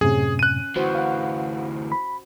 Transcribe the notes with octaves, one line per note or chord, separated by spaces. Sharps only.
F#2 A2 C3 C#4 G#4
F#6 D#7
D2 E3 F#4 C5
F5 F#5
B5